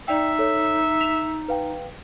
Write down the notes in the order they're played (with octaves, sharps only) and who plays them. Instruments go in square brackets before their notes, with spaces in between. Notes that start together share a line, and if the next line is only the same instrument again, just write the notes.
[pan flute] D#4 [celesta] D5 G5 [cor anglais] E5
[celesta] A4 C#5
B6 E7 F7
B4 F5 G5